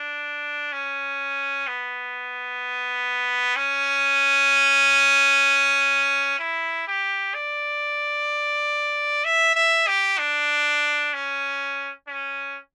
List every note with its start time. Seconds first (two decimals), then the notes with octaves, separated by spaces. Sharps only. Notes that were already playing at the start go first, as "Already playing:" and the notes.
Already playing: D4
0.72 C#4
1.67 B3
3.56 C#4
6.39 E4
6.87 G4
7.34 D5
9.24 E5
9.55 E5
9.87 G4
10.19 D4
11.13 C#4
12.08 C#4